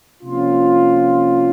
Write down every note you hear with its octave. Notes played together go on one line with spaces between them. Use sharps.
C3 F3 A#3 C#4 F4